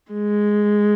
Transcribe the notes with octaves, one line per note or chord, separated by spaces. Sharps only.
G#3